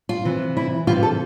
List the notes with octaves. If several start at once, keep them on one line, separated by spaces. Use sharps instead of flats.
F4
C3 E3
E4
C3 E3 F4
A4